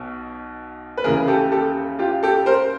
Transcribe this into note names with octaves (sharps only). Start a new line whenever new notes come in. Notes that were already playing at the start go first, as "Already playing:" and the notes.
Already playing: B1 B2
B4
D#2 C#3 E3 G#4 A#4
G4 A4
G4 A4
F4 G4
G4 A4
A#4 C5